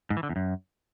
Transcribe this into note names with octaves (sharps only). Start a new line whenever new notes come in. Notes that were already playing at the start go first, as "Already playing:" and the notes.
G#2
E3
D3
E2
F#2